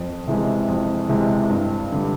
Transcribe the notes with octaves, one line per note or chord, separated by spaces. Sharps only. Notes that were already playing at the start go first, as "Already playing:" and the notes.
Already playing: F2
C3 E3 G#3
F2
C3 E3 G#3
G2
D3 G3